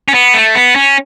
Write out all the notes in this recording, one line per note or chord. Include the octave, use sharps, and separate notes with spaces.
C#4
B3
A3
B3
C#4